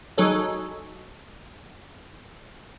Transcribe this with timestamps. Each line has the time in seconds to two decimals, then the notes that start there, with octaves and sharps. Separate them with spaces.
0.18 F#3 D#4 G#4 A4 C#5